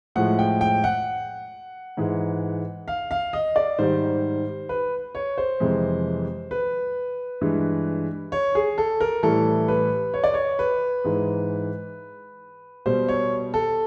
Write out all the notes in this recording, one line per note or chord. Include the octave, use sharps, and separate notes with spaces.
A2 F3 G#3 F#5
G5
G5
F#5
G#2 E3 G#3
F5
F5
D#5
D5
G#2 D#3 G3 C5
B4
C#5
C5
F2 C3 E3 G#3
B4
G2 E3 G#3
C#5
G#4
A4
A#4
A2 E3 G3 A4
B4
C#5
D5
C#5
B4
G#2 E3 G#3
B2 G3 C5
C#5
A4